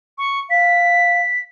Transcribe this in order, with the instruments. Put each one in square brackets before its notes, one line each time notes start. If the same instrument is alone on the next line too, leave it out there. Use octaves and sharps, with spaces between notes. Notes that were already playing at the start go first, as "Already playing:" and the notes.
[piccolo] C#6
[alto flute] F5 [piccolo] B6